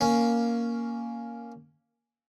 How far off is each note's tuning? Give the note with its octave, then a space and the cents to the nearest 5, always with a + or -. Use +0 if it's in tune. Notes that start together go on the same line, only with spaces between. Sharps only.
A#3 +0 C#4 +5